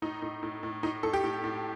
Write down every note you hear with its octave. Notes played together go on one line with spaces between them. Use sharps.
A2 D#4
A2
A2
A2
A2 D#4
A2 A4
G4
A2
A2